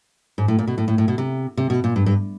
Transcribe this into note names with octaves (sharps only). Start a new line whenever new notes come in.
G#2
A2
A#2
B2
A2
A2
A2
B2
C3
C3
B2
A#2
G2
G2